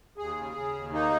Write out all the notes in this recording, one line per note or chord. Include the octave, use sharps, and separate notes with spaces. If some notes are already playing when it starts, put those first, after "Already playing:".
D#2 G#4
C#3
C#3
D#2
A#3 D#4